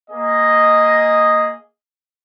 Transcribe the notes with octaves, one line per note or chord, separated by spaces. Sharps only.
A#3 G#4 D#5